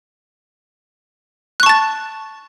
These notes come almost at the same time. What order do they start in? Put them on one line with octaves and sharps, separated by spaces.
F#6 C#6 A5 A6